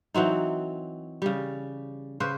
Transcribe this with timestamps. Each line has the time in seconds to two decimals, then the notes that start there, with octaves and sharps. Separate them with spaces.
0.14 E3 F#3 C4 D#4
1.22 C#3 G3
2.20 C#3 B4 C5